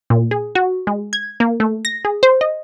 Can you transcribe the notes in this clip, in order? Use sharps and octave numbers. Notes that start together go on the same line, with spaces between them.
A#2
G#4
F#4
G#3
G#6
A#3
A3
A#6
G#4
C5
D#5